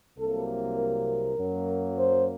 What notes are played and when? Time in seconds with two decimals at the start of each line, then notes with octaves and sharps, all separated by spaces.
0.18 C2 C3 F#3 A#3 A4
0.78 A#4
1.37 F#2 F#3 A#3
1.96 C5